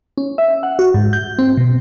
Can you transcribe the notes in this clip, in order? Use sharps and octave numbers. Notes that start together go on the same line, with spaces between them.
C#4
E5
F#5
F#4
G#2
G6
C4
B2